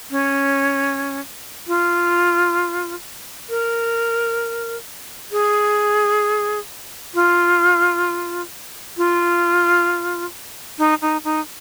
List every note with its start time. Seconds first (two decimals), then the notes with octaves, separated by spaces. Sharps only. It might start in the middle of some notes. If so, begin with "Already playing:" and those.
0.10 C#4
1.67 F4
3.49 A#4
5.32 G#4
7.14 F4
8.97 F4
10.79 D#4
11.02 D#4
11.24 D#4